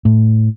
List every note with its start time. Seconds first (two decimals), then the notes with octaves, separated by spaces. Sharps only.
0.05 A2